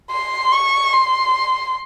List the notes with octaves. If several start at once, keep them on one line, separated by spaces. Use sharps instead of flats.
C6
C#6
C6